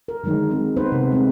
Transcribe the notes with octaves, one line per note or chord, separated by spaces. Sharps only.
A#4
D3 D#3 F#3 G#3 D#4
G#3 C4
B3 D#4 B4 C5
C3 A#4
G#3 C4